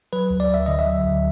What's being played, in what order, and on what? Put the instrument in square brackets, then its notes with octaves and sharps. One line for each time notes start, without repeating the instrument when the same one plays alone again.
[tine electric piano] F#3 B4
D2
D5
D2 E5
D3 D#5
E5
F#3
D2